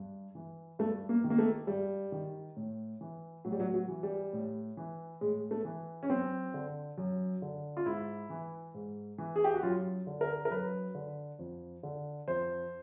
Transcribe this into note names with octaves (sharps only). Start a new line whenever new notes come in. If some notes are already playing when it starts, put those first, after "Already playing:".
Already playing: G2
E3
G2 A3
A#3
D#3
A#3
A3
G2 G3
D#3
A2
E3
A2 F#3
G3
F#3
F#3
E3
G3
A2
E3
A2 G#3
A3
E3
C#4
F#2 C4
D3
F#2
D3
F4
G#2 E4
E3
G#2
E3
G#4
G4
F#4
F#2 F4
D3
A#4
A#4
F#2 B4
D3
F2
D3
F2 C5